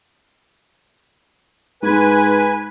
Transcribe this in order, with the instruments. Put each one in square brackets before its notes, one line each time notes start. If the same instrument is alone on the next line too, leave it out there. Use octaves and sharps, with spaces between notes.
[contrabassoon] G#2 [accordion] B4 G#5